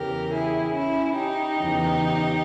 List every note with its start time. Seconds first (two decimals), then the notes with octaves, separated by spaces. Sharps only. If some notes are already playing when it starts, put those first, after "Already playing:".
Already playing: E2 C#3 E3 G4 A#4
0.33 E4 G#4
0.75 C#4 E4
1.17 D#4 G4
1.59 E2 C#3 E3